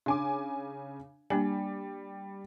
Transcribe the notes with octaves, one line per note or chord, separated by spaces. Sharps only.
C#3 D4 G#5 D6
G3 A#3 D4 G#5